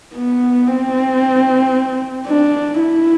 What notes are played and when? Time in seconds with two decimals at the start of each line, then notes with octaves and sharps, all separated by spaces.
0.15 B3
0.67 C4
2.27 D4
2.80 E4